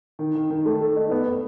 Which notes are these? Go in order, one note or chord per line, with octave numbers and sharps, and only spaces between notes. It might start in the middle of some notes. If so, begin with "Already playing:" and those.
D#3
D#3
D#3
A3
A4
D#4
B3
B3